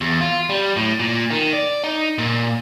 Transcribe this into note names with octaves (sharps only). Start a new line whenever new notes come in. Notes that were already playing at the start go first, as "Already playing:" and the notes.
E2
F4
G3
A2
A#2
D#3
D5
D#4
A#2